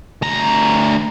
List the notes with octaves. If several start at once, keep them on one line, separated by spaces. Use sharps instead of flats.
D2 A#5